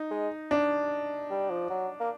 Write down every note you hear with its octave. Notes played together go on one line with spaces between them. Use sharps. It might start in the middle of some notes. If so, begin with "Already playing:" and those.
Already playing: D#4
G#3
D4
G3
F3
F#3
A#3